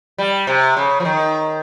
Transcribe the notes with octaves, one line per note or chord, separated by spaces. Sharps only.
G3
C3
C#3
F3
D#3